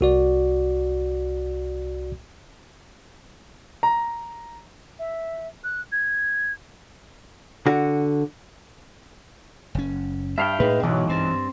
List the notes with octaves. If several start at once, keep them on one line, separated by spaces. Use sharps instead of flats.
C2 F#4 D5
A#5
E5
F#6
G#6
D3 F#4
F#1 C#4
G2 E5 F5 G5
A2 G#3 D#4 B4
B1 G#2 B2 E3 F#3
G2 C4